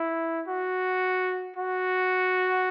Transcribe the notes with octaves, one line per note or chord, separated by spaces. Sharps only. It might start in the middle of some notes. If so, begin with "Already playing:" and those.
Already playing: E4
F#4
F#4